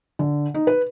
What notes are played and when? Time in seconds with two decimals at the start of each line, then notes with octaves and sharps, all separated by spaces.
0.19 D3
0.54 D#4
0.67 B4